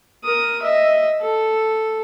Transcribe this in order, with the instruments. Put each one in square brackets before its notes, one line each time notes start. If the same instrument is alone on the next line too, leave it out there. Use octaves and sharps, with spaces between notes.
[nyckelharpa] A#4 D#6
D#5 E5
A4